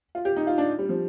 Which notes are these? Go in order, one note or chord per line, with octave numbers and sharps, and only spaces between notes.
F4
G4
D#4
F4
D4
G3
F3